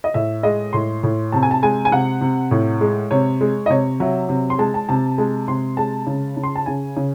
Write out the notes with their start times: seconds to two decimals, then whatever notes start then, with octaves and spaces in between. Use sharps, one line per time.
0.04 D#5
0.14 A2 E5
0.43 G#3 D#5
0.73 A2 C6
1.03 A2
1.32 C3 A5
1.43 G#5
1.51 A5
1.63 G#3 G#5
1.85 G#5
1.92 C3 F#5
2.21 C3
2.51 A2
2.81 G#3
3.11 C3 C#5
3.41 G#3
3.66 D#5
3.69 C3 C#5
4.00 F#3 E5
4.29 C3
4.50 C6
4.58 G#3 A5
4.74 A5
4.89 C3 A5
5.18 G#3 A5
5.48 C3 C6
5.77 G#3 A5
6.07 C#3
6.37 C#3
6.43 C6
6.56 A5
6.66 C#3 G#5
6.97 C#3